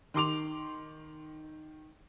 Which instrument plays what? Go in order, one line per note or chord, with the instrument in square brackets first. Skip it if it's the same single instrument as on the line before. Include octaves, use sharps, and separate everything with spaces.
[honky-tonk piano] D#3 C6 D6 F7